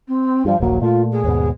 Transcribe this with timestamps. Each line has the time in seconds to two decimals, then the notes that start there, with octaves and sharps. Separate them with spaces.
0.07 C4
0.45 G2 F3 G3
0.60 D#1 A#1 F#3 A#3
0.82 A#2 A3 F4
1.12 G#4
1.24 D#2 G#2 B2